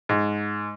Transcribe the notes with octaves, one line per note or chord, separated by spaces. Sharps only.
G#2